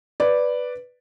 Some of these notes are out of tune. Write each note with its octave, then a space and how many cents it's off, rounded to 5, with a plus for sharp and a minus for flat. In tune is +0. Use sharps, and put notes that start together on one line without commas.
B4 +0 D5 +0